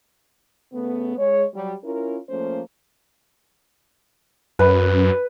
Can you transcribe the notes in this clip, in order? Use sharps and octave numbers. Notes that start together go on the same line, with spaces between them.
C#3 A3 B3
G#3 C#5
F#3 G3
C#4 E4 F4 A#4
F3 A3 A#3 C#4 C5
F#2 B4